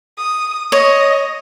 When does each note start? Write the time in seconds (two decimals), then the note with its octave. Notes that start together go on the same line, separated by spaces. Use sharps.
0.17 D#6
0.72 C#5 D#5